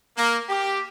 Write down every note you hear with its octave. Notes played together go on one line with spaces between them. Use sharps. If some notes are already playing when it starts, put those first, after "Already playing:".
A#3
G4